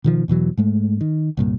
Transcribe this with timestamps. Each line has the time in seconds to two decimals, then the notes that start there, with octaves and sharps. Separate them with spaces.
0.04 B2 D#3 F3
0.28 E2 B2 E3 F#3
0.57 G#2 G#3 A3
1.01 D#3
1.37 C2 G2 A#2